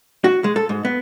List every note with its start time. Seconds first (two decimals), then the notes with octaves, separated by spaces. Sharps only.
0.24 F#4
0.44 G#3
0.56 A4
0.69 G#2
0.85 B3